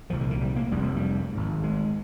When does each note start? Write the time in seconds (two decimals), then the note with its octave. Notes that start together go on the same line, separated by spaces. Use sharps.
0.10 A#2 F3
0.13 C2
0.21 D3
0.31 D#3
0.41 G3
0.56 A#3
0.71 F1 F2 C3 G3
0.84 F3
0.97 G3
1.33 G#1 G#2
1.63 G#3